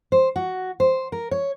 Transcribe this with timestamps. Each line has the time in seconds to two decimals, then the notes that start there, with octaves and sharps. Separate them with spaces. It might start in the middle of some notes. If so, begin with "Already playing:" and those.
0.12 C5
0.36 F#4
0.80 C5
1.12 A#4
1.31 C#5